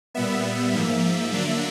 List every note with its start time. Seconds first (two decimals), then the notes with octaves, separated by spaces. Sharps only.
0.14 A#2 G3 B3 E5
0.73 G#2 F3 A#3
1.31 D3 F#3 A#3 D4